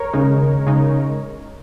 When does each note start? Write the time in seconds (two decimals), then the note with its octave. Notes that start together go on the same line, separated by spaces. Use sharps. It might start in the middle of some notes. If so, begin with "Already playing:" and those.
Already playing: A#4 C#5
0.13 D#2 C#3 G#3 D#4
0.67 C#3 G#3 D#4